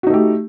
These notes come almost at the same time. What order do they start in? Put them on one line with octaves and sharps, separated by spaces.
F#4 D#4 A3 G4